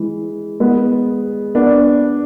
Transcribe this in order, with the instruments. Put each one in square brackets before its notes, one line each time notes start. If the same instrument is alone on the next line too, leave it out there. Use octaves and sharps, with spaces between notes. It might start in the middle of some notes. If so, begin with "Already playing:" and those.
Already playing: [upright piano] E3 G#3
G#3 B3
B3 D4